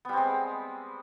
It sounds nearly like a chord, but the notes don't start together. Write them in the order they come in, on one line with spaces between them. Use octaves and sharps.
B3 G3 C4 G#3